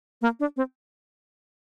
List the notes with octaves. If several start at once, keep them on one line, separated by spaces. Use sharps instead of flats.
A#3
D4
C4